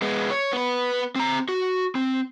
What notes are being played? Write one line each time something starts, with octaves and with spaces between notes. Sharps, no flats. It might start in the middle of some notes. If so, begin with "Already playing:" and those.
G#3 B3
C#5
B3 B4
C4 A#5
F#4
C4